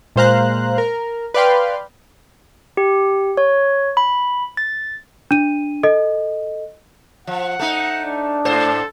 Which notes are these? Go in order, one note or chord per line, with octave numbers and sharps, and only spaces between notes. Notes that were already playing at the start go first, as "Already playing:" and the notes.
A#2 G#3 C5 F5 A#5 F#6
A#4
B4 D5 F5 G5 C6
G4
C#5
B5
A6
D4 D#7
A4 D#5
F3 F#5
A3 D#4
D4
G#2 A4 C5